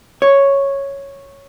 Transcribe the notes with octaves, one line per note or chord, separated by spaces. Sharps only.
C#5